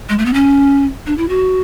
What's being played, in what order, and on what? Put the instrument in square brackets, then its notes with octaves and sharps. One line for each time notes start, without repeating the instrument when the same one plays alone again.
[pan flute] G#3
A3
B3
C#4
D4
E4
F#4